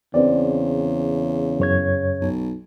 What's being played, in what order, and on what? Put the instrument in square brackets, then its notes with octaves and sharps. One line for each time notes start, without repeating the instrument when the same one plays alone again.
[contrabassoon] E2 [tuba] C#3 [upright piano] C4 D5
[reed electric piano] F#2 C#5 G#6
[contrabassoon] B1